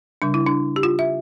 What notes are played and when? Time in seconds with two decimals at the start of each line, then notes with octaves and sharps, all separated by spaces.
0.22 C#3 G3 D4
0.34 E4
0.47 D4
0.76 G4
0.83 F4
0.99 E5